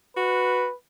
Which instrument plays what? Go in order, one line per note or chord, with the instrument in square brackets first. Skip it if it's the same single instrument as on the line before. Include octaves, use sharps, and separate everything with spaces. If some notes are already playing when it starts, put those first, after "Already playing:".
[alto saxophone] F#4 [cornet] B4